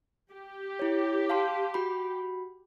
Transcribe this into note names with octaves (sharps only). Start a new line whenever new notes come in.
G4
E4 C#5
F5 A5 C6
F#4 B5